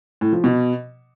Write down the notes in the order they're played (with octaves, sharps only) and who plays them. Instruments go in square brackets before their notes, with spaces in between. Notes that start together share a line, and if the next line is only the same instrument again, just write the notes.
[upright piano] A2
F3
B2